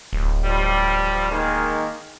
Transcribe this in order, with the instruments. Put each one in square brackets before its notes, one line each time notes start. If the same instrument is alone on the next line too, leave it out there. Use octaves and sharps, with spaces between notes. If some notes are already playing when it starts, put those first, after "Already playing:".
[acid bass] D1
[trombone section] F3 G3
D#3 G#3 A#3